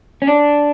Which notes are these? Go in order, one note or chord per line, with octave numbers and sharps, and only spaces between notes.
C#4
D4